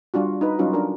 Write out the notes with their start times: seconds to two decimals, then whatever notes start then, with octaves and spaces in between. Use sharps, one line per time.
0.14 G3 D4 F4 F#4
0.41 D#4 B4
0.59 F#3 G3 C#4 D#4 F4 F#4
0.73 D4 A#4